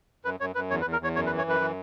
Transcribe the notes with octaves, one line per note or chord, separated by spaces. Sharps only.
F#2 B4
F#2 C#5
F#2 B4
E2 C#5
B4
E2
A#4
E2 C#5
F#2 C#5
B4
E3
C#5
F#2 B4
E3